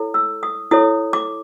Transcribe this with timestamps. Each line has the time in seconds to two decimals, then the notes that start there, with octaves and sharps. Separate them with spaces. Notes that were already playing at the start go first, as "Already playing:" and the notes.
Already playing: E4 A4 C#5
0.14 E6
0.43 D#6
0.71 E4 A4 C#5 D#6
1.13 D6